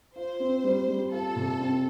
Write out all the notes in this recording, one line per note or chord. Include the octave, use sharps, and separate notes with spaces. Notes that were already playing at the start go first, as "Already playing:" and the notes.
F4 C5
C4
G3
G3
F4 A4
C3
C4